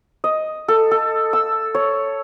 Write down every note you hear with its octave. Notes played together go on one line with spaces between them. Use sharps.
D#5
A4
A4
E6
C#5